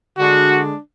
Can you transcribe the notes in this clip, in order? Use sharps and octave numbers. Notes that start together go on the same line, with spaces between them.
D3 G#3 D4 F#4